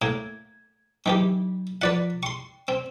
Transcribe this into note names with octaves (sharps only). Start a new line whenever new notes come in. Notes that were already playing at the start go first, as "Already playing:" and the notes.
A2 A#3 G#6
D#3 E3 F#3 D#4 G4
F3 F4 B4 D5 F#5 B6
G5 C6 C#6
C4